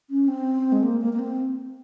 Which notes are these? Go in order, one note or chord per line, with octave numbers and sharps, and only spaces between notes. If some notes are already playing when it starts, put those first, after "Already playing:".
C#4
C4
G#3
A#3
A#3
A#3
C4